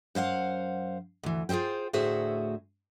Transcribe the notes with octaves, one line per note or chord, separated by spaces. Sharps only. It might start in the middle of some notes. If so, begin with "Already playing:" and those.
F#2 C5 F5 F#5
D2 E3
F4 G#4 A4 C5 G5
D2 A2 F#4 G#4 C5 E5